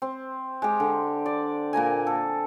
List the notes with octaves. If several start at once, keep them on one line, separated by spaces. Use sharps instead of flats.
C4
G#3 G4
D3
D5
A#2 A#3 A#4 G#5
A4